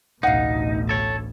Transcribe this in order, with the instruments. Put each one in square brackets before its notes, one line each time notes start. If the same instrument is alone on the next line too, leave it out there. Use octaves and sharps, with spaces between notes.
[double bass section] A1 D2 B2 [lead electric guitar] D#4 [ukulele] F5 F#5
[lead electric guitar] A4 C#5